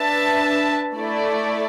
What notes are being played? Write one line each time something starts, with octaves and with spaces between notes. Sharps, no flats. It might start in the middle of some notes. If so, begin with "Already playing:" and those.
Already playing: D4 B4 E5 A5
A3 E4 D5